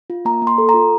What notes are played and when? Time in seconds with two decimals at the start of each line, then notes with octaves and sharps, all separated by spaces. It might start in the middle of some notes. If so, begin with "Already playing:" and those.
0.10 F4
0.25 A#3 A#5
0.42 A#3
0.47 C6
0.58 A4
0.69 A#5
0.74 F4